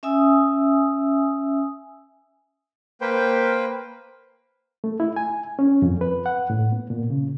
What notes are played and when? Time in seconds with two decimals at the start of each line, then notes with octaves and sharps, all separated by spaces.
0.03 C#4 E5 G#5 D#6 E6
3.01 A#3 B4 C5 G5
4.84 A3
5.00 E4
5.16 G#5
5.59 C#4
5.82 F2
6.01 B4
6.26 F#5
6.50 A2
6.72 B3
6.90 A#2
7.10 C#3